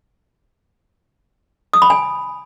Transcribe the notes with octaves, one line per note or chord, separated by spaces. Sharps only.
D#6
B5
G#5